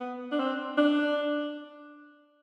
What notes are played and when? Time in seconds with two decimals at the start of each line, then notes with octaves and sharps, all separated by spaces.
0.01 B3
0.32 D4
0.40 C4
0.77 D4